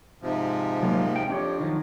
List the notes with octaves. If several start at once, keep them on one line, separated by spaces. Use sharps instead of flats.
G#2 C3 F3
F#3 A#3
G5
F2 D4 G4 C#5
D#3 F3 F#3